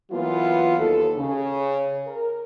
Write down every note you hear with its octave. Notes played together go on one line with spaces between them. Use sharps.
E3 F#3 A#3 B3 F4
D#2 A4
C#3
A#4